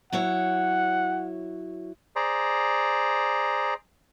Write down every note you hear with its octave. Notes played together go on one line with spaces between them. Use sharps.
F#3 E4 C#5 F#5
G#4 C5 D5 A#5